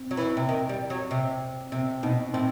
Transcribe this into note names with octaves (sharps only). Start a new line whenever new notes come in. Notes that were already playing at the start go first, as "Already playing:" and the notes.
Already playing: C4
F#3
E3
C3
D#3
G3
F#3
C3
C3 C4
B2 D#4
A2 C4